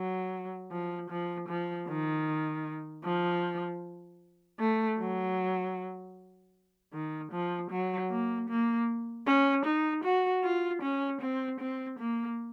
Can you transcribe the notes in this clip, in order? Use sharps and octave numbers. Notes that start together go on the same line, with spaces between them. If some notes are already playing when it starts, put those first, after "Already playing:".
Already playing: F#3
F3
F3
F3
D#3
F3
A3
F#3
D#3
F3
F#3
A#3
A#3
C#4
D#4
F#4
F4
C#4
C4
C4
A#3